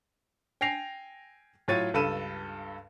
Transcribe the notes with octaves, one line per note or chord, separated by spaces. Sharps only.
G5 G#5 A#6 C7 F7
A2 F#3 F4 C#5 A6 D#7
C#2 G2 A4 B5 D#7 E7